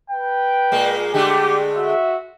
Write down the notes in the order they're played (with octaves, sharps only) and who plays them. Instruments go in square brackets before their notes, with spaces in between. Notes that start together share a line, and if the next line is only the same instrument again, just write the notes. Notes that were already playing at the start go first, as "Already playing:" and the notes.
[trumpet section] B4 G5
[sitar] A#2 G#3 A#3
[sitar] D3 G#3 A3 [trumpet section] G4
[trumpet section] F#4 E5